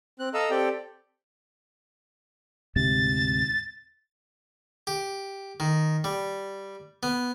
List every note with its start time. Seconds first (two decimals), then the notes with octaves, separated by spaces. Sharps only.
0.19 C4 F#6
0.34 A4 D#5 F5 A#5 E6
0.51 C4 G4 A4 D5 G5
2.76 D2 G#2 C3 A6
4.87 G4
5.60 D#3
6.04 G3
7.03 B3